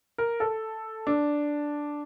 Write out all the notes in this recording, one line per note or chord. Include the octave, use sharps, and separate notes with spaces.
A#4
A4
D4